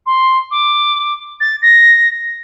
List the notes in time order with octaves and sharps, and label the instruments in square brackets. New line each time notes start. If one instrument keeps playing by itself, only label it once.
[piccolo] C6
D6
A6
A#6